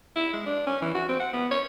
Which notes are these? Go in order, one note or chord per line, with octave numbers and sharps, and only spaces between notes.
E4
G#3
D4
C#4
E3
F#4
C4
F#5
B3
C#5